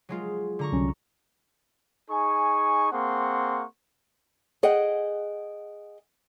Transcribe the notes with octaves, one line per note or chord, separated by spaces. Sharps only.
F#3 G#3 F4
D3 A#5 C#6
C2 F#3 C#4
D#4 G#4 G#5 C#6
A#3 C4 G#4 F#5 C6 C#6
G#4 D#5 F#5 G5